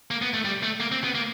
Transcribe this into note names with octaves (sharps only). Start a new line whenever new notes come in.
A#3
B3
A3
G3
A3
A#3
C4
B3
A#3